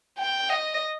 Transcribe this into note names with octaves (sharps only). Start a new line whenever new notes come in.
G5
D#5